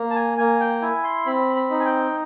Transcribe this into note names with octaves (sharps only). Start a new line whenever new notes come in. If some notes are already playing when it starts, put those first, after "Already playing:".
Already playing: A#3
A5
G#5
A#3 G#5
G5
E4 G#5
C6
C4 B5
B5
D#4
G#5
G5